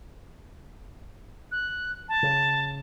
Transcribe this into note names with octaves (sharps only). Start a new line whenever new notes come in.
F#6
A5
C#3